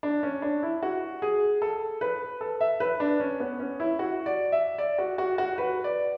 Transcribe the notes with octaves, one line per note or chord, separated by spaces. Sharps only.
D4
C#4
D4
E4
F#4
G#4
A4
B4
A4
E5
B4
D4
C#4
B3
C#4
E4
F#4
D5
E5
D5
F#4
F#4
F#4
B4
D5